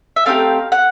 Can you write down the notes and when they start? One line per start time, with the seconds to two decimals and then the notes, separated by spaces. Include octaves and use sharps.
0.16 E5
0.26 A3 C4 D#4 G4 F5
0.72 F#5